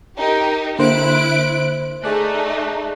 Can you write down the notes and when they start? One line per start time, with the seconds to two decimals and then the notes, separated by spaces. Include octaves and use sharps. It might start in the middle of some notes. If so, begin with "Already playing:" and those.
0.17 D#4 G4 A#4
0.79 D3 A#3 E4 C5 F#6 D7
2.04 A3 D#4 G#4 D5 F#6